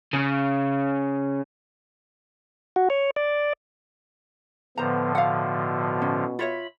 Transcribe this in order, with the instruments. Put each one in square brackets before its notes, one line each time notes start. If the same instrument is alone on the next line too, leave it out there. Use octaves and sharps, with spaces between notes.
[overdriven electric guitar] C#3
[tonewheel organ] F#4
C#5
D5
[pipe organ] A2 D3 F3 [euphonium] B3 [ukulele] C5 A#5
[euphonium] B2 [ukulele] F5 F#5
[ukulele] C#4
[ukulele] F4 C#5 E5 [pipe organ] B5